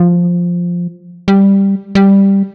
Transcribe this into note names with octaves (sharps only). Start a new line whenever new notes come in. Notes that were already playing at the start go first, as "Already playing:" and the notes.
Already playing: F3
G3
G3